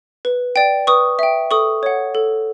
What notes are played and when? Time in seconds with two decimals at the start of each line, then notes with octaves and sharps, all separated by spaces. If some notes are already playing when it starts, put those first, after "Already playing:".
0.25 B4
0.56 D5 G5
0.87 B4 C#6 D#6
1.19 E5 G5
1.51 A4 C#6 D#6
1.83 C#5 F#5
2.15 A4